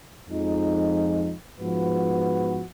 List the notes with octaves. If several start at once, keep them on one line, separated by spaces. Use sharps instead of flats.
F2 F3 G#3 D#4
G#2 F3 B3 F#4 B4